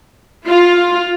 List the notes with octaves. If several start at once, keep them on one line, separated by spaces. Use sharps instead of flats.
F4